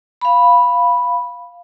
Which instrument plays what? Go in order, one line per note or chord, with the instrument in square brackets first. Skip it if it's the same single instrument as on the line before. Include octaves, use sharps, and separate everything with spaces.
[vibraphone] F5 B5